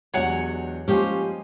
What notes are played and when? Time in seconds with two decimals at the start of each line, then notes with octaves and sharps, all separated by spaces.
0.14 E2 F#3 G#3 D4 G4 C#5 F#5 G#5
0.88 F3 G3 G#3 A#3 C#4 G4 C5